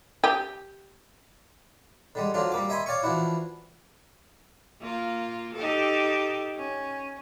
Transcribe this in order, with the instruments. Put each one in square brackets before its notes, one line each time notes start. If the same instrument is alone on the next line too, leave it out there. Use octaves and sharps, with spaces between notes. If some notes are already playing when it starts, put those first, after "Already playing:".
[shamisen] G4
[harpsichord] D3 G3 G#3
D3 F3 F#3 D4 F4
G3 A#3 D6
D#5 E5 G5 G#5 B5 C6
C#5 D5 F5 G5 C#6
E3 F3 D4 E4 F#4
[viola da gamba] A#3 F4
D#4 G4 A4
C#4